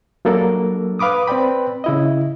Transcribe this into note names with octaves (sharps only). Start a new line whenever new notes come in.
F#3 G3 A#3 D4 A4 A#4
B4 F5 B5 D6 D#6
C4 B4 D5 G5 B5
C#3 E4 D#5